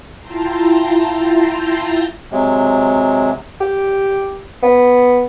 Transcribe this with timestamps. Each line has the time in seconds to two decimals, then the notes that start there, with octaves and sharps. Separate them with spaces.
0.20 E4 F4 G5 A5 A#5 C6
2.31 C3 F#3 G#3
3.60 G4
4.63 B3